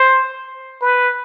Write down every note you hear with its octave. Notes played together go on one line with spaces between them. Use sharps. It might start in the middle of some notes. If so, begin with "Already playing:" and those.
Already playing: C5
B4